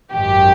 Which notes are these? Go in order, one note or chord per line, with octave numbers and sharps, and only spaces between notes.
G#1 F#2 D#3 G4